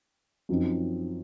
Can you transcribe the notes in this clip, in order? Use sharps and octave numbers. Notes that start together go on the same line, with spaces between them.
F#2 F3 C4 D#4